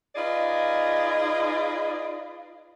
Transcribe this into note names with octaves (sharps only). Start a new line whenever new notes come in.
D#4 F4 G#4 B4 D5 D#5